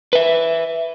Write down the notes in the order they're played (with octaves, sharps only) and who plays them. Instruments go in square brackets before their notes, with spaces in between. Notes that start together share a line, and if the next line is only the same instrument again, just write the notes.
[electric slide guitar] B4 E5